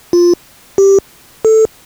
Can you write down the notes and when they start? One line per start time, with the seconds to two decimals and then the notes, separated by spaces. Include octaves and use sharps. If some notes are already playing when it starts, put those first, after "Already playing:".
0.13 F4
0.78 G4
1.45 A4